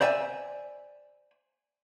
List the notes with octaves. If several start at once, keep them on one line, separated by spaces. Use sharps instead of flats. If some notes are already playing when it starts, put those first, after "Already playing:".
C5 D5 E5 G5 G#5